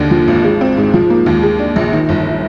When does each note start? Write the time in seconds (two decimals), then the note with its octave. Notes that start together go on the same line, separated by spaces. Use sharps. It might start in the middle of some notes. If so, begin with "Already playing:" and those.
Already playing: D#2 D3
0.11 F3
0.28 G#1
0.44 G#3
0.61 C4
0.77 G#2
0.94 F3
1.10 A#3
1.26 D#2
1.43 G#3
1.59 D4
1.76 A#1
1.93 D#3
2.09 G1